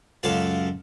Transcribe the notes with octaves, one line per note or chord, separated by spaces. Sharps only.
C#2 F#2 A4 F5 A5